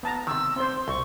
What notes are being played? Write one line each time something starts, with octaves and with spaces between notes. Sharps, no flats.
B3 A5 A#5
C3 D#3 E6
C4 C5 C6
C2 C#6